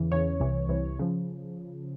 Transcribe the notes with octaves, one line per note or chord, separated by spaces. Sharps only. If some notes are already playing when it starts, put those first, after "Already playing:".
Already playing: E2 C#3 E3
E2 C#3 E3 C#5
C2 C3 E3
C2 C3 E3
C#3 F3